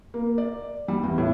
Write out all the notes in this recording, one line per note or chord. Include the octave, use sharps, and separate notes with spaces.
A#3
D5
G3
E2
A2